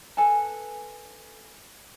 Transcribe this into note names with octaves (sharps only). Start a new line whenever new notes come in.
A4 B4 G#5 A5